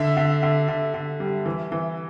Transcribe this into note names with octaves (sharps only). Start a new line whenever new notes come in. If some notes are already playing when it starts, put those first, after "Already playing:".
Already playing: D3 E5
D3
D3
D3
D3
G3
E3
E3